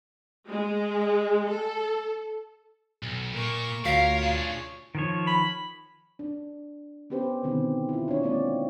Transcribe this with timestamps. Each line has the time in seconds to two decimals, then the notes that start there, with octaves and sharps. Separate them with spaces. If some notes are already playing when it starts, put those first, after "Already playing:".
0.47 G#3
1.48 A4
3.03 B1
3.34 A#2 A#4 C#6
3.85 D2 F4 F#4 A#4 C#5 F5 B6
4.23 D4 G#4
4.95 D#3 F3 C#5
5.27 B5
6.19 D4
7.10 B3 C#4 G4 B4 C5
7.43 B2 D3 D#3 B3 C4
7.89 E4 F4
8.08 D4 C#5
8.23 G#3 A#3 C4 D#4 D5